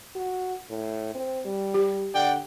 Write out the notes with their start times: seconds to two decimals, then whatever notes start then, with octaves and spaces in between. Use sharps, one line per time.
0.15 F#4
0.70 A2
1.15 C4
1.45 G3
1.74 G4
2.14 D3 D5 F#5 G5